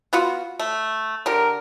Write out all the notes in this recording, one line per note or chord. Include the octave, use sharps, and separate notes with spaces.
B3 F4 F#4
A3
D3 G4 A#4